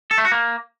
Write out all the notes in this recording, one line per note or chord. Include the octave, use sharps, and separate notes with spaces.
A4
A3
F#4
A#3